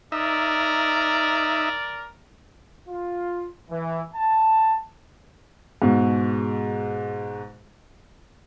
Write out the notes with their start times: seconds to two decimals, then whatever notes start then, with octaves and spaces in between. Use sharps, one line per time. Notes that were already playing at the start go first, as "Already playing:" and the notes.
0.12 D#4 A#4 D5 E5
2.89 F4
3.71 E3
4.15 A5
5.82 G#2 B2